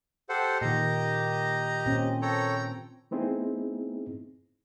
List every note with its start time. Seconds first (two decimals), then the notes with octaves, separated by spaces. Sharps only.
0.29 G4 A4 C5 F#5
0.61 A#2 D#3 G4 D#5 A#5
1.86 A#2 C4 C#4
2.22 A4 C#5 G5 A#5
3.11 A3 B3 C4 D#4 E4 G#4